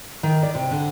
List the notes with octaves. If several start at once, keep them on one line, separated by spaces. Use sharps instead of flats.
D#3
D5
C3
D3